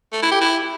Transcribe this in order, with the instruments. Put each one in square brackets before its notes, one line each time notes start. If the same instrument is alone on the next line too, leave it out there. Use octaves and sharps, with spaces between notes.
[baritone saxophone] A3
E4
G4
E4